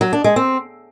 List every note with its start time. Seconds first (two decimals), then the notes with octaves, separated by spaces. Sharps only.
0.01 F#3
0.13 D4
0.24 G#3
0.36 C4